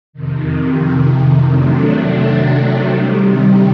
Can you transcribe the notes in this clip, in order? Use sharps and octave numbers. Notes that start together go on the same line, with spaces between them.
F2 C3 D#3
C3 D#3 F#3 A3 D4
C3 D#3 G3